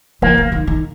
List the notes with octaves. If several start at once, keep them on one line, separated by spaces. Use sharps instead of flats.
F3 A#3
F#3
D#3
D#3